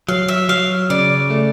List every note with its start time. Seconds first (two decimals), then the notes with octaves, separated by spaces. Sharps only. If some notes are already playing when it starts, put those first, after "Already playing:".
0.09 F#3 F5
0.28 E5
0.49 F#3 F5
0.90 C#3 D5
1.30 A3